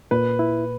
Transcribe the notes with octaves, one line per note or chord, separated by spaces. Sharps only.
A#2 B4
E4